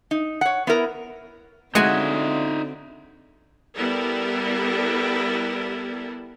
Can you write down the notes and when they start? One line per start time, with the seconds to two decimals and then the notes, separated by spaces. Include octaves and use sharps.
0.11 D#4
0.41 C#5 F#5
0.67 B3 E4 A#4
1.75 D3 G#3 C4 D#4 F#4 E5 G#5
3.75 G3 B3 E4 A4 A#4